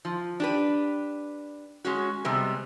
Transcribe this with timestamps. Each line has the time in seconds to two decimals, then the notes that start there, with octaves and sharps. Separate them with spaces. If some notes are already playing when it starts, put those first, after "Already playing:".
0.05 F3
0.40 D4 G4 B4
1.85 G#3 C#4 F#4
2.25 C3 G3 G#3 B3